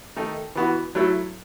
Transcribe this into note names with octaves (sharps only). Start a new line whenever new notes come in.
D#3 A3 D#4
E3 B3 F#4
F#3 A3 E4 A4